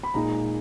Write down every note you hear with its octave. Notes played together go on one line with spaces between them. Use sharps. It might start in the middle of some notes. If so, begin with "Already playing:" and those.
B5
A#2 G#3 D#4 A#5